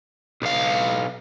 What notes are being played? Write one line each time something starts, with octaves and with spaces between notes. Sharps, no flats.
B1 F5